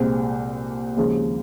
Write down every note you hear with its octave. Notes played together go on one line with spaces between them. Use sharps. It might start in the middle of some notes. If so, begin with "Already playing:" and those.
Already playing: C2 A#2 G#3 C4
D#2 C#3 F3 G#3 C#4